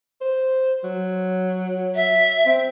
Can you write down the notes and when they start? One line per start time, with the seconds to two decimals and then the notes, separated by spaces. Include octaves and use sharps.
0.21 C5
0.84 F#3
1.95 E5
2.46 C4